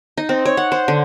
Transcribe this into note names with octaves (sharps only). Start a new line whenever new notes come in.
D#4
C4
C#5
F#5
C5
D3